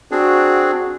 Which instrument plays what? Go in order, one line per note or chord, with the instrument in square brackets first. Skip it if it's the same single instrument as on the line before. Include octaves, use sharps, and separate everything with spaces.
[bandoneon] C4 D4 G#4 [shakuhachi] F#4